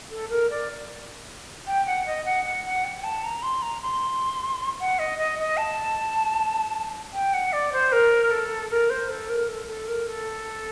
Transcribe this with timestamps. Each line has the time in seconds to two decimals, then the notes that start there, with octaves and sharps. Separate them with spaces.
0.11 A4
0.30 A#4
0.50 D5
1.67 G5
1.87 F#5
2.06 D#5
2.25 F#5
2.45 F#5
2.65 F#5
2.84 G5
3.04 A5
3.24 A#5
3.43 C6
3.62 A#5
3.82 C6
4.80 F#5
4.99 D#5
5.18 D#5
5.39 D#5
5.57 A5
7.14 G5
7.34 F#5
7.53 D5
7.73 C5
7.92 A#4
8.31 A4
8.70 A#4
8.90 C5
9.09 A4
9.29 A#4
9.49 A4
9.67 A4
9.88 A#4
10.07 A4